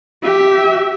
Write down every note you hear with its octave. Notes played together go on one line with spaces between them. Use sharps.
G4 E5